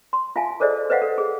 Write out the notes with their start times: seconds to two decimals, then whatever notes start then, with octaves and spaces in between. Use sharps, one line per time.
0.13 C6
0.36 F4 E5 F5 G#5 A5
0.60 G#4 A4 C5 D5 D#5
0.90 B4 C5 D#5 F5 F#5
1.02 A4
1.18 G#4